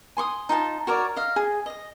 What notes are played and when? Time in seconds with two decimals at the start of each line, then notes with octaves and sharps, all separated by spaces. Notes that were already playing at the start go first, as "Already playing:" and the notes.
0.17 G#5 C6 C#6 D#6
0.49 D#4 F4 F#5 A5
0.87 F#4 A#4 C#5 D5
1.16 D#5 F5
1.36 G#4
1.66 D#5 D#6